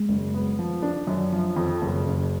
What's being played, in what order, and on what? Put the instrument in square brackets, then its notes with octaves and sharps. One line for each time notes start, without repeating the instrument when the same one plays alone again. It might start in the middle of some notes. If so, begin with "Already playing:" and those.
Already playing: [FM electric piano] G#3
[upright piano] F#1
B3
F3
D4
F#2
F3
F2
F#1
F#1